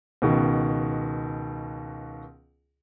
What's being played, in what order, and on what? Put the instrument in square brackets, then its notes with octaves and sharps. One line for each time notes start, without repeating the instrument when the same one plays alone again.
[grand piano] C#2 B2 D#3